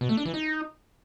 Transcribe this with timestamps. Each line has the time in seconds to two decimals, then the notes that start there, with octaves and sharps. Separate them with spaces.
0.01 B2
0.09 A3
0.17 D4
0.26 E3
0.34 D#4